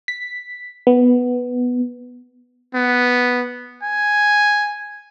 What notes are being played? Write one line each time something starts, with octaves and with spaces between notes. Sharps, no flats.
B6
B3
B3
G#5